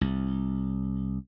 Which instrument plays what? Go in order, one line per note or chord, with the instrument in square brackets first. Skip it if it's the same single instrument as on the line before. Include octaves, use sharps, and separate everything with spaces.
[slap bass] C2